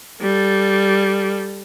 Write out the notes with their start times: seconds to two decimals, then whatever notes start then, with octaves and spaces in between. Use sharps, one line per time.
0.21 G3 A4